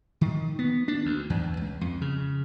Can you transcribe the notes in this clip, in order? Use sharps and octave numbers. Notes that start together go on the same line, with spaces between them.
D#3
B3
D4
D2
E2
C#2
F2
C#3